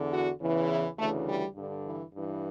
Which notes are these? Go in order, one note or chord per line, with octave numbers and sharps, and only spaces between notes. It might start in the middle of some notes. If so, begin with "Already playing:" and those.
Already playing: E2 D3
F#4
E2 C#3 E3
E4
D2 C#3 E3 A3
G3
G2 D3
E3
G2 E3